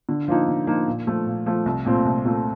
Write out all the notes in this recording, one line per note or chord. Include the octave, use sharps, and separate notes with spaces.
D3
F3 A#3 D#4
D3
F3 A#3 D#4
A#2
F3 A3
A#2
F3 A3
C2
A#2 A3 C4 F4
C2
A#2 A3 C4 F4